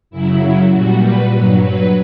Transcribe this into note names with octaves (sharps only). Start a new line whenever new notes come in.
F#2 C#3 F#3 E4
A#2 G3 F#4
B4
G2 F#3
B4